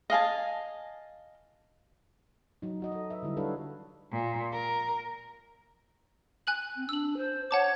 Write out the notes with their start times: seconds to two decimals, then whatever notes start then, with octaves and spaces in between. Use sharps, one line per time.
0.10 D#5 F5 G#5 A5
2.62 F#3 D#4
2.80 F#3 F#4 D#5
2.92 A4 D#5
3.10 B4 E5
3.23 D3 G3 E4
3.37 D4 F#4 A4 B4 C#5 F5
4.12 A#2
4.53 A#4
6.47 G#5 F#6 F#7
6.76 C4
6.89 D4 E6 F#7
7.17 C5
7.51 C#5 F#5 A5 D6